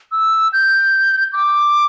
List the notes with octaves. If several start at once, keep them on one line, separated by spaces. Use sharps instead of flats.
E6
G6
D6